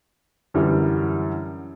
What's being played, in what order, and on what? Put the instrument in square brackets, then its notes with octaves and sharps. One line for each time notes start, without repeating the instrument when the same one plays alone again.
[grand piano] F#2 D3 E3 G3